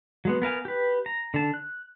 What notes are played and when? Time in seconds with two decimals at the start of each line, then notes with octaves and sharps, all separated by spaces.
0.25 F#3 G#3 B3
0.42 B3 A#4 F5 G#5
0.65 G4 B4
1.06 A#5
1.34 D3 A5
1.54 F#6